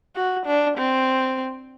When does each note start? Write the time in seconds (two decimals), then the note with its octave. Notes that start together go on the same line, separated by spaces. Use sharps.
0.16 F#4
0.46 D4
0.77 C4